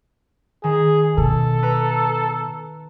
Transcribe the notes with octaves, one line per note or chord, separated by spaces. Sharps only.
D#3 G#4
B2 A4
B4 A#5